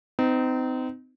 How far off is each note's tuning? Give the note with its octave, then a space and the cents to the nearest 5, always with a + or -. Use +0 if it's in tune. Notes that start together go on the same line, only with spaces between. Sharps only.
C4 -35 D#4 +0